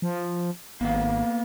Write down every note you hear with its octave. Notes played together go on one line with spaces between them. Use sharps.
F3
G#1 A#3 B3 F5